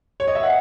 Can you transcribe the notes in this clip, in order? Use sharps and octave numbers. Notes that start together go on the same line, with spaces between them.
C#5
D#5
E5
F#5